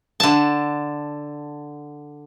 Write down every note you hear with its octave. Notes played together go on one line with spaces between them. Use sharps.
D3 A5